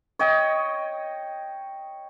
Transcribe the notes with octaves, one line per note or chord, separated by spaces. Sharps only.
C#5 D#5 G5